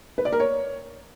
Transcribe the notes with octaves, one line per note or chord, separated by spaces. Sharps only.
B4
D5
A#4
C#5